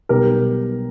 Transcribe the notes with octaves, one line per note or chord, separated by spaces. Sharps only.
B1 B2 G3 B3 G4 A#4